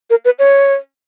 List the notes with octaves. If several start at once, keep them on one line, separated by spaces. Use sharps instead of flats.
A#4
B4
C#5